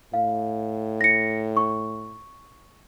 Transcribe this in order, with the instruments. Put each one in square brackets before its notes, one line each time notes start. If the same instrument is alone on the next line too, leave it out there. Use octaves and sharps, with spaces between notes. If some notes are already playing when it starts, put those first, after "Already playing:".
[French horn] A2 [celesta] F5
[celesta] A#6 C#7
C#6